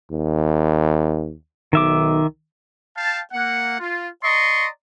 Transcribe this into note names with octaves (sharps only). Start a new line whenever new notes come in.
D#2
B1 D#3 E5 D6
F5 G5 A5
A#3 F#5
F4
D5 D#5 A#5 C6 C#6